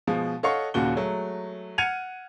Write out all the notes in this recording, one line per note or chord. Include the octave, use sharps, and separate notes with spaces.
B2 F3 G#3
A4 C#5 D#5 F5 F#5 C#6
D#2 A#2 C#3 F#4 G7
F#3 G#3 A3
F#5 F6 G#6 C#7 D#7 F7